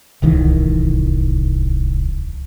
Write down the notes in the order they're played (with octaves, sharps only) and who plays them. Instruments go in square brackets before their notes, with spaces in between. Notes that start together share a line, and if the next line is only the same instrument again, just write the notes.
[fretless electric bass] D1 C2 D#3 E3